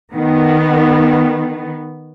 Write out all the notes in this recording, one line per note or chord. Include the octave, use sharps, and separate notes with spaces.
D#3 B3